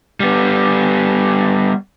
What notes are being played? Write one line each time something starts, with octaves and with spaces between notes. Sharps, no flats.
G3 B3